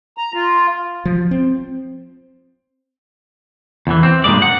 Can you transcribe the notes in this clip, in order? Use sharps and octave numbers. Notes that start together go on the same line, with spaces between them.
A#5
F4
F3
C4
E2 E3
C4
G2 A#2 E3 G#3 D5
F#5